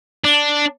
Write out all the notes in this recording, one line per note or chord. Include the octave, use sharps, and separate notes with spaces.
D4